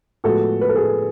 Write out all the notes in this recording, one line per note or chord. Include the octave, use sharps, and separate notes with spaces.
A2 F3 G#3 B3 F#4 A4
B4
A4
G#4 B4